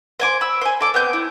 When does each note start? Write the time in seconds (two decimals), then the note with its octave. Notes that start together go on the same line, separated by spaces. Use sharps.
0.20 C5 G#5 D6
0.41 B5 E6
0.61 C5 G#5
0.81 A4 D6
0.94 B3 C4 G6
1.13 E4